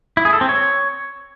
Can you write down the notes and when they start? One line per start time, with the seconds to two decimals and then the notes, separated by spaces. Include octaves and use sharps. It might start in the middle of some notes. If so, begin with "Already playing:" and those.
0.17 E4
0.25 G#4
0.33 A4
0.41 C4
0.49 C#5